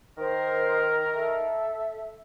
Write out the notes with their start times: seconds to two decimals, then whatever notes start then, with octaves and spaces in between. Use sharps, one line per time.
0.18 D#3 A#4 C5 G5 D#6
1.12 A4 E5